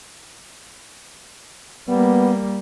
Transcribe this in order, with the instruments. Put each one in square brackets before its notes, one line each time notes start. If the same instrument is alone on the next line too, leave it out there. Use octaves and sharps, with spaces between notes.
[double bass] G3 A#3 [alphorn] B3